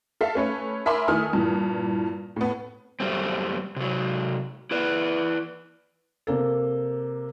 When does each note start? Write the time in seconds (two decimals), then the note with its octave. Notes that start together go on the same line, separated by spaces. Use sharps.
0.21 A4 E5 F5
0.35 A3 C#4 B4 C#5
0.86 A#4 E5 G#5 B5 C6 D6
1.08 D#3 A3 E4 G#5 D#6 F6
1.33 G2 A#2 E3
2.36 A2 B3
3.00 F#2 G3 A3 C4
3.76 C3 F#3
4.71 E4 B4 D5
6.27 C3 A#3 A4